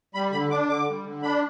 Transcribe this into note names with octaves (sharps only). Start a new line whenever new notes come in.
G3 B5
D3 B5
D4 D6
D3 D6
G3
D3
D4 B5